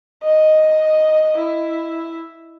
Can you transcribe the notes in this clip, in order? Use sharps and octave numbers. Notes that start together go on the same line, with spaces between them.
D#5
E4